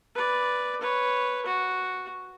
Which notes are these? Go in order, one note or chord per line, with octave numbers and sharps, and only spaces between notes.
B4 D5
B4 C#5
F#4